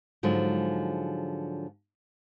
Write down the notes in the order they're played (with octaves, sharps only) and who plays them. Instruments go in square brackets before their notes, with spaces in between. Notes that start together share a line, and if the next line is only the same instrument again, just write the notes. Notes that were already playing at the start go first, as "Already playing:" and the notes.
[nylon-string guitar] G#2 D3 F3 F#3 G#3